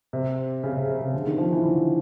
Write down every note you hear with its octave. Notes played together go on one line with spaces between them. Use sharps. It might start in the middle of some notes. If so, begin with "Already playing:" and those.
C3
C#3
C3
C3
C#3
D3
D#3
F3
E3
D3